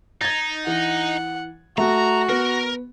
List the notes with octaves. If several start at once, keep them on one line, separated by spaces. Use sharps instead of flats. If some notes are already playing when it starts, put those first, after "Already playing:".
D#4 G#6 A6
E3 F#5
A3 F#4 A#5
B3 A#4